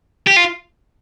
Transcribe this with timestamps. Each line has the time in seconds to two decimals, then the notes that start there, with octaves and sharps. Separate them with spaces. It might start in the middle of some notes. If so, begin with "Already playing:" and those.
0.27 G4
0.36 F4